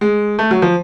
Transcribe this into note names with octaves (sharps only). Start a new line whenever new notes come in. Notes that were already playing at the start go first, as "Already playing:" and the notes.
G#3
A3
F#3
F3